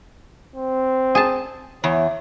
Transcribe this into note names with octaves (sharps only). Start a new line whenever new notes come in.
C4
G#4 A5
E2 C#5